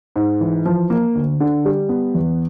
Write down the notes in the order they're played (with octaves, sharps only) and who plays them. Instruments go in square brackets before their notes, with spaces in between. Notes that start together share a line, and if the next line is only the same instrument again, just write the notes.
[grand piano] G#2
E3
F3
A#3
D2
D3
G3
B3
E2